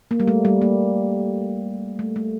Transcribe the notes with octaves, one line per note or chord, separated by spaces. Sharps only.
A#3
G3
A3
G3
A#3
A3
A3